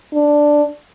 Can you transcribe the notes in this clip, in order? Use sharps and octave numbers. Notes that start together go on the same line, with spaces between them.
D4